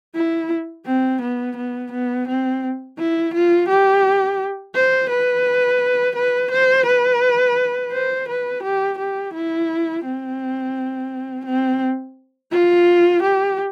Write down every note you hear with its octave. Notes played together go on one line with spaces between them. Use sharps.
E4
C4
B3
B3
B3
C4
E4
F4
G4
C5
B4
B4
C5
B4
C5
B4
G4
G4
E4
C4
C4
F4
G4